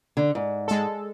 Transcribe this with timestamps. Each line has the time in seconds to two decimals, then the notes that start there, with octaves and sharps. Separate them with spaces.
0.17 D3
0.35 G#2
0.68 G#3 A4